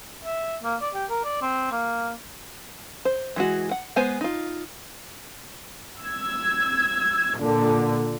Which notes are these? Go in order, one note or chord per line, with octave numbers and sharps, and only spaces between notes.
E5
A#3
D5
G4
A#4
D5
C4
A#3
C5
E3 G#3 F#4
F#5
G#3 B3 C5 G#5
D#4 F4
E6 G#6
A#2 D3